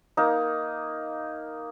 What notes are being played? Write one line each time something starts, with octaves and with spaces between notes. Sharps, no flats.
A#3 D#4